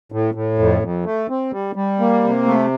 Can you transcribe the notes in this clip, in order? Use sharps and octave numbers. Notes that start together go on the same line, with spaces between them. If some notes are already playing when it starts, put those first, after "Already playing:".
A2
A2
F2
F2
A3
C4
G3
G3
A#3
C3
A3